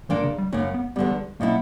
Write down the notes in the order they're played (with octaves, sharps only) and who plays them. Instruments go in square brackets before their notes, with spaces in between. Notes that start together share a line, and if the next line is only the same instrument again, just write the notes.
[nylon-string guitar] A#2 A#3 D4 [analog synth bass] E3
[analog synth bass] C#3
G3
[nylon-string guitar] F#2 C#3 F#3 [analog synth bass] A#3
[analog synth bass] B3
[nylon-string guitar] E2 D3 G3 [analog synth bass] B3
[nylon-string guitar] B2 F#3 C#4 E4 [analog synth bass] A#3